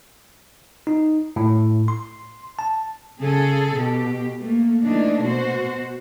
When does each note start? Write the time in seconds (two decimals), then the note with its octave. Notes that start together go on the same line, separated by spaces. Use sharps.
0.87 D#4
1.36 A2
1.88 C6
2.59 A5
3.20 C#3 G#4 A4
3.75 B2 G4
4.39 A3 A#3
4.83 E3 A3 A#3 D4 D#4
5.22 B2 F#4 C5